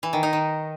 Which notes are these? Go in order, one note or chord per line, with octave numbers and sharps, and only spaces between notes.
E3
D#3
D#4
D#3